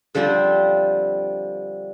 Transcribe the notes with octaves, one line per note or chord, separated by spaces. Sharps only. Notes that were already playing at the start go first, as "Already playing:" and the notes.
D3 F3 G3 C4